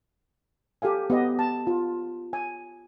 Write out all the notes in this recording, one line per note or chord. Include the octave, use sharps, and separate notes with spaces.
G4 A4 F5 G#5
B3 G4 D#5
A5
F4
G#5